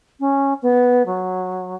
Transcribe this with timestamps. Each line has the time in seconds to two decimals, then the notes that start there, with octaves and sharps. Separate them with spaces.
0.19 C#4
0.62 B3
1.05 F#3